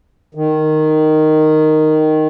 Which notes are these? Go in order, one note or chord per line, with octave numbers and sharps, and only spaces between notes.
D#3